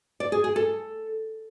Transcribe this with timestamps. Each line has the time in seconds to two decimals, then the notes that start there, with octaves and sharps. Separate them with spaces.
0.20 D5
0.32 G#4
0.44 G#4
0.56 A4